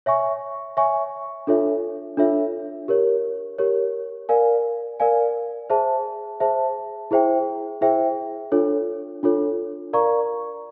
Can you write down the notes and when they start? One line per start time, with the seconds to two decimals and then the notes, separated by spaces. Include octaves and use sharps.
0.06 C#5 E5 G#5 C#6
0.77 C#5 E5 G#5 C#6
1.47 D4 F4 A4 C#5 E5
2.17 D4 F4 A4 C#5 E5
2.88 G4 A#4 C#5
3.58 G4 A#4 C#5
4.29 A#4 D5 F5 G#5
5.00 A#4 D5 F5 G#5
5.70 G#4 C5 E5 A5
6.40 G#4 C5 E5 A5
7.11 E4 G#4 C5 E5 G5
7.81 E4 G#4 C5 E5 G5
8.52 D4 F4 A4 C#5
9.23 D4 F4 A4 C#5
9.93 A#4 D5 F5 A#5 C#6